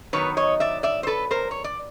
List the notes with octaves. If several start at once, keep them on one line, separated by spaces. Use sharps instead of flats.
D#3 F#3 B3 B4 C#5
C#5 D#5
D5 E5
D5 E5
C5
A4 B4
A#4 C5
C#5
D5